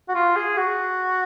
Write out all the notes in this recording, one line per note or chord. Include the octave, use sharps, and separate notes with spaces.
F#4
F4
G#4
F#4